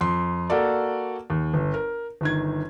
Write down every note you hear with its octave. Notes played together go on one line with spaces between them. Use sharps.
F2 C6
A#3 F#4 A4 D5
D#2
G1
A#4
G1 D#3 G#6